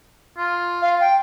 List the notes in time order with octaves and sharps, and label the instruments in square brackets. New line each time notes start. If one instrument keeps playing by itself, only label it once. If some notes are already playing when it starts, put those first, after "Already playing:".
[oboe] F4
[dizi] F5
G5